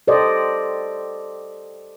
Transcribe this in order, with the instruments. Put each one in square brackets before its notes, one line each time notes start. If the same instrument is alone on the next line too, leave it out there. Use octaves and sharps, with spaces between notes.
[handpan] G4 A4 C5 D5 D#5